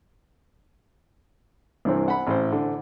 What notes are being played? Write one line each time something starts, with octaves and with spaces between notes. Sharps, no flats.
C2 G2 E3 C4
F#5 B5
A1 C5
D3